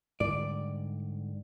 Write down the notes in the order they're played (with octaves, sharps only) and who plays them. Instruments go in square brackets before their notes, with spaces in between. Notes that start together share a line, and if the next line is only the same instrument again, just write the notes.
[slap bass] G#2 D3 G3 [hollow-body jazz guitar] D5